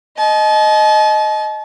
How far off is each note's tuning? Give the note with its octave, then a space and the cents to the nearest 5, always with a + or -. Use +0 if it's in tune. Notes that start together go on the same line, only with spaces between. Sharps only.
D#5 +0 A5 -40